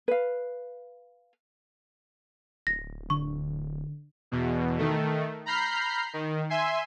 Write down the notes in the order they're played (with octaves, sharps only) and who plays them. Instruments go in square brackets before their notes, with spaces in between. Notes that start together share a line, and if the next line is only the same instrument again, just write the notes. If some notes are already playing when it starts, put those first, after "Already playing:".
[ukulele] B4 F5
[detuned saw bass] D1 [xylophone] A#6
[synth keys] D3 [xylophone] C#6
[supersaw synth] E2 B2
D#3 A3
A#5 B5 F6 G6 C7
D#3
E5 G#5 C6